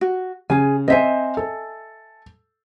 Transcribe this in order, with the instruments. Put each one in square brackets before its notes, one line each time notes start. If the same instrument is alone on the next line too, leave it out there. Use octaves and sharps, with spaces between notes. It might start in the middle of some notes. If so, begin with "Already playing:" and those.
[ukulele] F#4
[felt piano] C#3 [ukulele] G#4 G#5
[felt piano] C4 C5 [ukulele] D#5 E5 G#5
[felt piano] A4